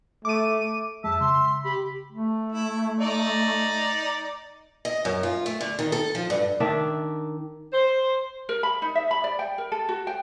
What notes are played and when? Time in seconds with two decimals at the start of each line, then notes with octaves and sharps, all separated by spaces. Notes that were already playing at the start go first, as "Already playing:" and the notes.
0.25 A3 D6 D#7
1.04 F2 G#3 E5 A5
1.20 C#3 C6
1.64 G4 B5
2.12 A3
2.52 E4
3.00 D#4 D5
4.85 D#5
5.05 F#2
5.23 F4
5.46 A3
5.61 D3
5.79 D#3
5.92 A4
6.15 F3
6.30 G2
6.60 D#3 D4 D5 E5
7.71 C5
8.49 A#4
8.63 B5
8.82 D#4
8.95 E5
9.11 B5
9.24 D5
9.39 G5
9.58 A#4
9.72 A4
9.89 F#4
10.07 G5